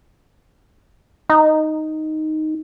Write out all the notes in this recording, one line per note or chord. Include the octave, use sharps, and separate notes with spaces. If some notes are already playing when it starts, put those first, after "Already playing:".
D#4